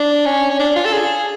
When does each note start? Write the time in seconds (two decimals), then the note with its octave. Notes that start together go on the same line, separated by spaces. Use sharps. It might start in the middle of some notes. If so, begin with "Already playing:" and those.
Already playing: D4
0.26 C#4
0.51 C#4
0.59 D4
0.76 F4
0.85 A4
0.93 G#4